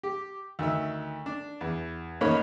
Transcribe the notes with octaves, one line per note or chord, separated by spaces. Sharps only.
G4
D2 D#3 E5
D4
E2
A1 D#3 A#3 D#4 C#5 B5